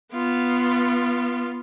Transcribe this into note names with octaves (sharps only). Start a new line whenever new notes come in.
B3 F4